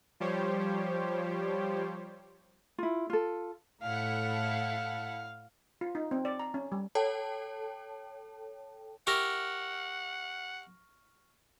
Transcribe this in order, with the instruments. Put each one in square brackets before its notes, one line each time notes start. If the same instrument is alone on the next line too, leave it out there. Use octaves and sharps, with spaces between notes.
[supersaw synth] F3 G3 G4 C5 C#5
[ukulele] E4 F4
F4 A4
[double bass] A2 [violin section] E4 A4 F#5 [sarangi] F5
[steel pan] F4
D#4
C4
D5
A#5
C#4
G3
[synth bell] A4 C#5 G5 A5
[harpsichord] E4 G4 A#4 [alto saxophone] F#5 [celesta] C#6 F6 A#6